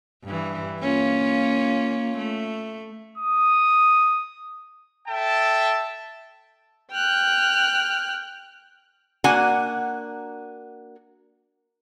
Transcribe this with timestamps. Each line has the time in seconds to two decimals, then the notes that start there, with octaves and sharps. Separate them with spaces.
0.24 G2 E3
0.81 A#3 C#4 F4
2.17 A3
3.18 D#6
5.08 A4 E5 G5 A5
6.92 G5 F6 F#6
9.24 A#3 D4 F#4 F#5 G#5